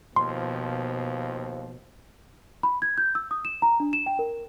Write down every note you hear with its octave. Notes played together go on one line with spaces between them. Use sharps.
D#2 B2 F3 C6
B5
G#6
G6
E6
D#6
E7
A#5
D4
E7
G5
A#4